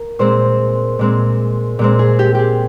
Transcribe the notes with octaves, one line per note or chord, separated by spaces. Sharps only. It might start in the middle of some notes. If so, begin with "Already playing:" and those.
Already playing: A#4
A#2 G#3 C4 C5
A#2 G#3 C4
A#2 G#3 C4
G#4
G4
G4 G#4